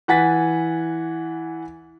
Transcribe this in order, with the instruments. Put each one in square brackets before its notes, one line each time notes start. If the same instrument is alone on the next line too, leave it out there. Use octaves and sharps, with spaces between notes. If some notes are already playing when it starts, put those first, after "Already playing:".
[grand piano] E3 F#5 G#5 A6 B6